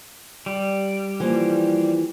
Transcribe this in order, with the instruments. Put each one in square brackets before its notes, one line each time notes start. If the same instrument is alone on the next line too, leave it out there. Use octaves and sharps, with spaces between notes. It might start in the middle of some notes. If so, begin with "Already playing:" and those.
[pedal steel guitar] G3
[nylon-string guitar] E3 F3 A#3